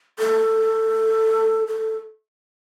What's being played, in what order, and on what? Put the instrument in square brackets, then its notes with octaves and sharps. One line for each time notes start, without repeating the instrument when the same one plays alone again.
[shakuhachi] A4
A4